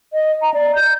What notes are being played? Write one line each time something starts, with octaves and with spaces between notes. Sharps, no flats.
D#5
A#5
D5
G6